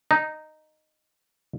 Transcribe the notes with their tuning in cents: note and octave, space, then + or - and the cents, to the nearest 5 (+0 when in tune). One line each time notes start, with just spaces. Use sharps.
D#4 -10